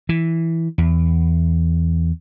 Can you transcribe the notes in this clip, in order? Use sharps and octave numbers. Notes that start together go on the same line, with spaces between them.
E3
E2